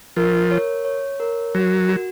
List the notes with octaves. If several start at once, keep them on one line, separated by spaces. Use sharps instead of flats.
F3 A#4
C#5
C#5
A#4
F#3 F#4
F#4